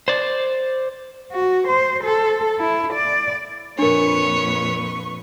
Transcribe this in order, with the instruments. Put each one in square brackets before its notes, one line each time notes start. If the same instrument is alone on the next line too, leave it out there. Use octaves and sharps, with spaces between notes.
[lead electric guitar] C5 D5
[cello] F#4
C5
A4
E4
D5
[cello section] F2 A#2 B4 [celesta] D4 A#4 [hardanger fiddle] C#5 [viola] C#6